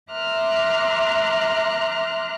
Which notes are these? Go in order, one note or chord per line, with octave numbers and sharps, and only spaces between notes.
E5 A#5 C6 D6 F6 F#6